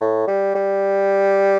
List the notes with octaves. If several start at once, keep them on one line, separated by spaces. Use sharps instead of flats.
A2
G3
G3